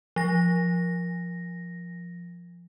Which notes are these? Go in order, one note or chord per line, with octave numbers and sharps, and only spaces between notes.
F3 A#6